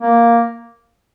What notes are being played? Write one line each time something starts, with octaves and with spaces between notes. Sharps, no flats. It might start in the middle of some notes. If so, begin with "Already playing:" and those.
A#3